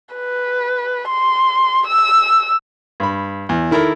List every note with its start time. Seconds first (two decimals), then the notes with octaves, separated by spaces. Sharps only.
0.15 B4
1.08 C6
1.88 E6
3.00 G2 B5
3.49 E2
3.71 D#3 E4 A4 A#4